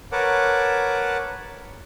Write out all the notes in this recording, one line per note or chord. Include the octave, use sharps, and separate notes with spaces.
A#4 B4 C#5 F#5 A5 D6